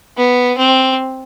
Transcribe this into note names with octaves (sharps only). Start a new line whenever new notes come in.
B3
C4